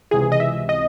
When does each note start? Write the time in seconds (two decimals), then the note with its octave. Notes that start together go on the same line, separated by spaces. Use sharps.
0.11 C#2 C3 E3 G#4
0.32 D#5
0.40 E5
0.69 D#5